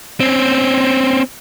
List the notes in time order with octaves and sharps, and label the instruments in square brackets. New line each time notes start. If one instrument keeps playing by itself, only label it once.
[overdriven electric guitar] C4 C#4